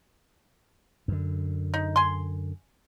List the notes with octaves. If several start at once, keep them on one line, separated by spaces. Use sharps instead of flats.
F#2 D3
D#4
G#5 C6